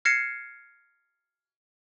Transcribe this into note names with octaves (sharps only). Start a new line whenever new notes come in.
F6 G#6 A#6 C7 C#7 E7